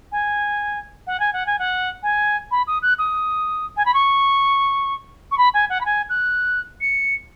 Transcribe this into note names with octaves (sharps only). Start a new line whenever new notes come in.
G#5
F#5
G#5
F#5
G#5
F#5
G#5
B5
D#6
F#6
D#6
G#5
B5
C#6
C#6
B5
G#5
F#5
B5
G#5
F#6
C#7